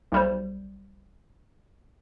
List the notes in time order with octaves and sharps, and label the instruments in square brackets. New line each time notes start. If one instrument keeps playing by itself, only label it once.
[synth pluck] B1 G3 C5